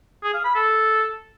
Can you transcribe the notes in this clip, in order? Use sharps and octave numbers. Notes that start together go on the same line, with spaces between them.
G#4
F5
B5
A4